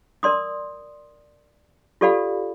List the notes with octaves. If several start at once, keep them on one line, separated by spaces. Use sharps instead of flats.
A#4 D5 C6 D#6
F4 G4 A4 D5 F5 B5